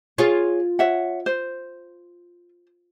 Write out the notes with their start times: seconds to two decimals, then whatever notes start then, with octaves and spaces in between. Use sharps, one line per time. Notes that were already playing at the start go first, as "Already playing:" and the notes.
0.18 F4 G#4 C#5
0.79 C#5 E5 F#5
1.26 C5